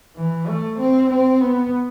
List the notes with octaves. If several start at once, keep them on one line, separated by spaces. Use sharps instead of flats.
E3
A3
C4
C4
B3